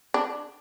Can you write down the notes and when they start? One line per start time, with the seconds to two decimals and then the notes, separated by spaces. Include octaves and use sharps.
0.14 D4